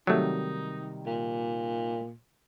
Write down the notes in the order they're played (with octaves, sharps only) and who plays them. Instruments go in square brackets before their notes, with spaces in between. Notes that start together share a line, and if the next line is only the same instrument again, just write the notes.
[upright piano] C3 D#3 G3 [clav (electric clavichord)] F#3 A3 [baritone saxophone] D#4
[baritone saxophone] A#2